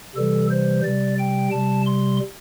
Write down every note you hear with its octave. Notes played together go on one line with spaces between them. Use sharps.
C3 E3 G3 A4
C5
C3 G3 D5
G5
C3 G3 A5
C6